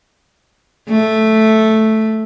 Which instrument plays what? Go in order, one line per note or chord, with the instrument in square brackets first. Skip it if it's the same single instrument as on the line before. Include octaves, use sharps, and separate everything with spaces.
[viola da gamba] A3